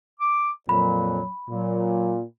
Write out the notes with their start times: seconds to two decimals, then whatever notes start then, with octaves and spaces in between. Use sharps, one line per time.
0.20 D6
0.69 F2 A#2 F#3 B5
1.49 A#2 F#3